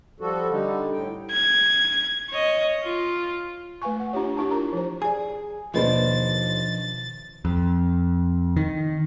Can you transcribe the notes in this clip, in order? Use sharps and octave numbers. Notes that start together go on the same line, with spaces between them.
F3 G3 F#4 A4
D3 G3 D#4
A2 G5
G#6
C#5 D#5
F4
A3 B4 F5 G#5 C#6
F#5
D4 F4 G4 C#5
D4 E4 G4 A5
F4 A#4 A5 A#5
F3 C5
G#4 D5 G#5
D#2 B2 D#3 F3 D4 B4 C5 A6
F2
D#3